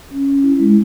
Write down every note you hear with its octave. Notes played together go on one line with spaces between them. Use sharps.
C#4
C#4
E4
G#3